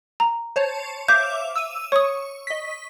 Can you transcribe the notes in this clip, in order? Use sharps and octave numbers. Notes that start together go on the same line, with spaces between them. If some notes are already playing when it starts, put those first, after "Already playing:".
A#5
C5 C#5 A5
E5 F5 D6 G6
E6 D#7
C#5 C#6 D#6
D#5 B6